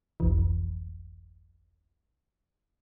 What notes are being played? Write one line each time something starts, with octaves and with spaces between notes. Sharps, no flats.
G1 C2 F2 E3